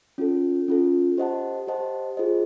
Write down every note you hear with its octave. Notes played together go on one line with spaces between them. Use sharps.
C#4 F4 A4
C#4 F4 A4
G4 C5 D#5 F#5 A5
G4 C5 D#5 F#5 A5
F4 G#4 C5 D#5